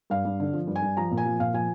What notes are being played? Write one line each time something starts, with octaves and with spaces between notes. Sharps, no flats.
G2 F5
G2
D3
F3
G2
G#5
G2
F3 A#5
A#2
G#5
F3
A#2 F5
F3 G#5